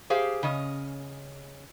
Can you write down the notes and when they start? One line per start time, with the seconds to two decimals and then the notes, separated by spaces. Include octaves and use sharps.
0.10 G4 G#4 C5 F5
0.43 C#3 C#4 D#5